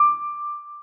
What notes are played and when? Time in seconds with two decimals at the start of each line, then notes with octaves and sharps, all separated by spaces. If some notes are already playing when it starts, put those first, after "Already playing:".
Already playing: D6